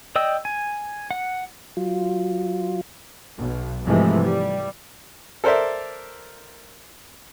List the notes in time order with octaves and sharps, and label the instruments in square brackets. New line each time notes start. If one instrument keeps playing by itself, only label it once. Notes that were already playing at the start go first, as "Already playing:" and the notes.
[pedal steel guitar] D5 D#5 G5 E6
G#5
F#5
[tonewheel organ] F#3 F4
[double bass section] B1 B2
G#2 C3 E3 F3 G#3 A3
G3
[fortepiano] A4 A#4 C5 D5 E5